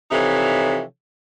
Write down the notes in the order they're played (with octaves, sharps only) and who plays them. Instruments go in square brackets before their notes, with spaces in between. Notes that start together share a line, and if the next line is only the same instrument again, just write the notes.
[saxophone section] C3 E3 F3 D#4 A4 C#5